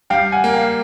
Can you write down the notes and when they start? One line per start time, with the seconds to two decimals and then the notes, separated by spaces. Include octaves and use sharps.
0.10 G3 F5 G5
0.32 F#5 G#5
0.44 A#3
0.54 F5 G5